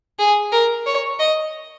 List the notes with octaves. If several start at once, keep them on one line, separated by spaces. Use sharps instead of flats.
G#4
A#4
C#5
D#5